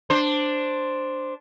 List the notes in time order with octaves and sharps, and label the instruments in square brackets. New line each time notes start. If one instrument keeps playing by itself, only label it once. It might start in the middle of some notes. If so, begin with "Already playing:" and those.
[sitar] D4 C5